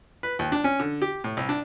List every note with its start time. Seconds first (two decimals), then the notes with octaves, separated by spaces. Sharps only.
0.23 B4
0.39 D#2
0.52 D4
0.64 C#4
0.80 D3
1.02 G4
1.24 A2
1.37 C2
1.49 D4